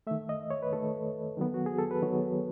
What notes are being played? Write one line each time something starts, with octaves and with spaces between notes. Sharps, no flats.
D#3 A3 E5
D#5
C#5
B4
D#3 A3 A4
D#3 F#3 B3
F#4
G#4
A4
B4
D#3 F#3 B3 C#5